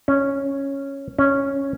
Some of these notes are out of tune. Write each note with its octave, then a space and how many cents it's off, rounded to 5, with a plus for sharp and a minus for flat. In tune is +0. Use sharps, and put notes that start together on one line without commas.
C#4 -5
C#4 -5